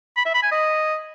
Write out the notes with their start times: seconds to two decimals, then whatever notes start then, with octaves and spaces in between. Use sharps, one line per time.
0.17 B5
0.25 E5
0.34 B5
0.43 G#5
0.51 D#5